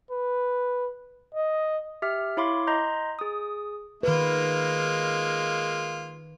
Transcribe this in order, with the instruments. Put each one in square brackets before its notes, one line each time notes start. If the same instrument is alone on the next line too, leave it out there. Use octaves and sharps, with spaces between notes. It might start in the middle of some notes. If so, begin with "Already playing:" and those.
[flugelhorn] B4
D#5
[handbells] G4 E5 F6
E4 C#5 F5 B5 C6 D6
D#5 A#5 C6 G6
G#4 D#6
[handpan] D#3 B4 [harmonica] G#3 A#3 F4